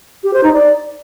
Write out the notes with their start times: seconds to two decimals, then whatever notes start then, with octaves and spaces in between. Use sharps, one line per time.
0.24 G4
0.34 C5
0.44 D#4
0.54 D5